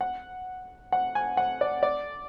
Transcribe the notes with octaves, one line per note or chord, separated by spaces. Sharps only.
F#5
F#5
G#5
F#5
D5
D5